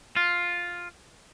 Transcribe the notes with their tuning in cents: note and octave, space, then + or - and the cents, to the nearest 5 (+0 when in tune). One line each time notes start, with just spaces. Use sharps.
F4 +5